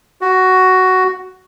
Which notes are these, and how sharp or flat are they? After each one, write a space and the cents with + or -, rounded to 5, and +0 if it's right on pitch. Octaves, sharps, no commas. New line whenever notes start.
F#4 +10